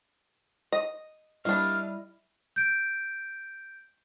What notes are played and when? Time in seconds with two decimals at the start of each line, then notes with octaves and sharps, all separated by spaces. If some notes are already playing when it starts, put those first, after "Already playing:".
0.72 D#5
1.45 G3 A#3 D4 E4 D#5 F6
2.56 G6 D7